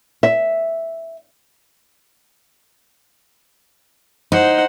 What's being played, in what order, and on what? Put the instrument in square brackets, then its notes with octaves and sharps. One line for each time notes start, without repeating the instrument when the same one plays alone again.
[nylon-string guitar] E5
[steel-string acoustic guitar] D#4 [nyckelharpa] C5 F#5